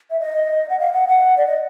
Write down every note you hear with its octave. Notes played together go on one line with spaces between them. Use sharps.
E5
D#5
F#5
F5
F#5
F#5
D5
D#5